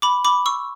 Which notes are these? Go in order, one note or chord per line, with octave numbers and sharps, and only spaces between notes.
B5 D6
B5 D6
C#6 E6